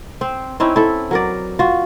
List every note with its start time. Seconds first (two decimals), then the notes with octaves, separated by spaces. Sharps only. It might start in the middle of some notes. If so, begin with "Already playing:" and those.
0.21 C4 C5
0.60 C4 C#4 D#4 E4
0.76 E4 A4
1.11 F#3 A#4 D5
1.59 F4 F#4